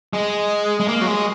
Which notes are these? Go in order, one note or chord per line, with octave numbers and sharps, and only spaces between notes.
G#3
G#3
A#3
F#3
G#3